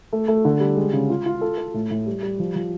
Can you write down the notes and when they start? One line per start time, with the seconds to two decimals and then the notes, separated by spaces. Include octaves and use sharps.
0.13 A3
0.28 A3
0.45 D3
0.60 G3
0.77 G#3
0.93 C#3
1.10 F4
1.26 F4
1.41 A4
1.58 A4
1.74 A2
1.91 A2
2.07 G3
2.22 G3
2.39 F3
2.55 F3